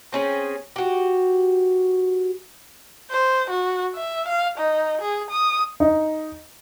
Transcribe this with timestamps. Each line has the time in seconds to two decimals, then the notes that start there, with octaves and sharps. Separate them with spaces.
0.12 C4 C#4 G#4
0.76 F#4 G4
3.10 C5
3.50 F#4
3.95 E5
4.28 F5
4.58 D#4
5.01 G#4
5.30 D#6
5.80 D#4